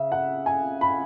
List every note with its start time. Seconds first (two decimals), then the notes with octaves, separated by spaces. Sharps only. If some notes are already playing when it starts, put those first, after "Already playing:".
Already playing: C#3 E5
0.12 F#5
0.46 G#5
0.81 B5